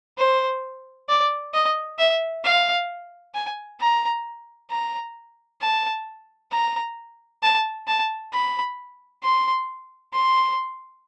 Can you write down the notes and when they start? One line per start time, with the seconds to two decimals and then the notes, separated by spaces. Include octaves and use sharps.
0.18 C5
1.09 D5
1.54 D#5
1.99 E5
2.44 F5
3.35 G#5
3.80 A#5
4.71 A#5
5.61 A5
6.51 A#5
7.43 A5
7.88 A5
8.33 B5
9.23 C6
10.13 C6